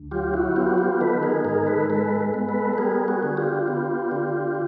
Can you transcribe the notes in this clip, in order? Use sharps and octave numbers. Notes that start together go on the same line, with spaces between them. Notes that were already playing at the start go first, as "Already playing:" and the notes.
Already playing: D2
F#3 F4 G4
E4 F#4
B3 F4 G4
F#4
F4 G4
D#3 A4 B4
G#4 A#4
G#2 G#4 A#4
A4 B4
G#3 A4 B4
B3
A4 B4
B4
G3 G#4 A#4
F#4 G#4
D3
F4 G4
B3
D3